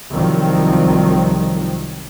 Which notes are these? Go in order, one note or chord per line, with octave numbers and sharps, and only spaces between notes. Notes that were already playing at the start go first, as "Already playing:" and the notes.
C2 D#3 F3 F#3 C4